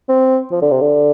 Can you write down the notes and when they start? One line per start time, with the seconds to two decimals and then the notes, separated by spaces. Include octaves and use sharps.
0.09 C4
0.51 F3
0.62 D3
0.71 C3
0.81 D3